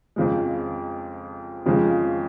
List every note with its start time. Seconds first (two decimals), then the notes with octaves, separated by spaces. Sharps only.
0.16 F2 C#3 F3 G#3
1.66 F2 C#3 F3 G#3